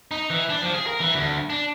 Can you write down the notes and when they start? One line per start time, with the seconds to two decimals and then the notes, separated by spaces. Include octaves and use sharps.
0.11 D#4
0.30 E3
0.49 D4
0.62 F3
0.74 G#4
0.86 A#4
1.00 E3
1.15 D2
1.50 D4